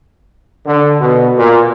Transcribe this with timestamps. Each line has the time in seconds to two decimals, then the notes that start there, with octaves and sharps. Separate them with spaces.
0.67 D3
1.01 B2
1.38 A#2